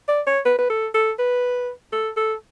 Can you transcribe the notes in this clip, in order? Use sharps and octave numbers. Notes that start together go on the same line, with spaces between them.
D5
C#5
B4
B4
A4
A4
B4
A4
A4